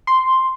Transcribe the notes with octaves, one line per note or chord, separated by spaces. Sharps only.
C6